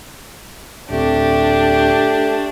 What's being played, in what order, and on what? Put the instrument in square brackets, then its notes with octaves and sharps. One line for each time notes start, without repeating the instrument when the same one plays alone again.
[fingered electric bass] D1 C4 [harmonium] A3 [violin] D4 [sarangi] G4